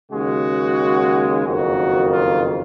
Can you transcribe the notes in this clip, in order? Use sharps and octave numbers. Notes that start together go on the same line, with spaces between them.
D#2 C#3 G#3 F#4
F#1 F2 D#3 F#4
F4